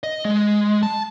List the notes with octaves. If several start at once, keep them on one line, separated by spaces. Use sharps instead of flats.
D#5
G#3
A5